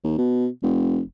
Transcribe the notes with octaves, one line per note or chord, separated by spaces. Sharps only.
D#2
B2
F1